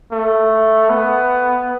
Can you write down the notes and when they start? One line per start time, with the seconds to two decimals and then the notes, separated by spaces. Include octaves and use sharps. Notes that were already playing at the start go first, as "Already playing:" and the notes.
0.12 A3
0.89 B3